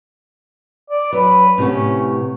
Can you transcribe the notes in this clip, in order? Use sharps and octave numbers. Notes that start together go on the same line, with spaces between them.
D5
F#3 B4
A2 C3 B3 C#4